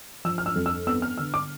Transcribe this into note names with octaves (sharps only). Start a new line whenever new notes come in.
F3 E6
F6
E6
F2
E6
B3 E6
F6
D3 E6
D6